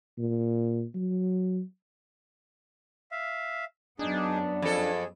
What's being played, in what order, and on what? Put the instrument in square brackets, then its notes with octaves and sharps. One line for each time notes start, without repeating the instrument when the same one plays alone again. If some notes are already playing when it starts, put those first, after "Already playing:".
[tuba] A#2
F#3
[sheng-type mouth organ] E5 F5
[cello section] F#2 B3 [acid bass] D4 [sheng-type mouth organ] D#4 G#4
[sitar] F2 A4 [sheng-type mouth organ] G#4